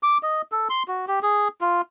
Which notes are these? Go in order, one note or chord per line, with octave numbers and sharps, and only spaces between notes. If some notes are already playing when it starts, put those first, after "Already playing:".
D6
D#5
A4
C6
F#4
G4
G#4
F4